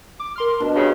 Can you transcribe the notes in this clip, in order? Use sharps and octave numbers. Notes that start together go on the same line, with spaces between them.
D6
A#4 C6 F6
B2 D4
G2 C#3